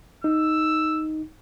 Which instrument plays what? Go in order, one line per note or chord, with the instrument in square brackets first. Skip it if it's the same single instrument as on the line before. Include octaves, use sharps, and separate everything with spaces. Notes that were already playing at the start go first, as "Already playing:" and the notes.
[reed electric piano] D#4 [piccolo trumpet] E6